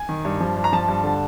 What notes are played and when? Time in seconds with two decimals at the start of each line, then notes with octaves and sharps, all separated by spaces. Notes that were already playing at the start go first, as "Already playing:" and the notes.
Already playing: G#5
0.09 D#3
0.25 G2
0.40 F3
0.57 G2
0.64 A#5
0.73 F3 A5
0.88 G2
1.04 D3